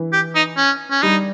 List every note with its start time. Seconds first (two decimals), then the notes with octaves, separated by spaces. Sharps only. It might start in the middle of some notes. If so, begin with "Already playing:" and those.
Already playing: E3
0.13 G4
0.35 D#4
0.57 C#4
0.91 C#4
1.03 G3 D#4